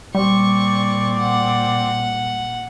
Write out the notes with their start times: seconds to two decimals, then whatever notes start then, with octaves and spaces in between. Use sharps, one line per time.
0.15 A#2 G3 C4 D5 C#6
1.19 F#5